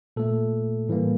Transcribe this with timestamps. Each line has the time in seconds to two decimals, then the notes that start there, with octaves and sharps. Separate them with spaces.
0.16 A#2 A3 A4
0.89 A2 E3 G3 A#3